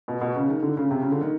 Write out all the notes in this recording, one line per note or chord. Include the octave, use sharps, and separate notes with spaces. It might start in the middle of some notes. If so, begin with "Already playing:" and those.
B2
B2
C#3
D#3
D3
C#3
C3
C#3
D3
D#3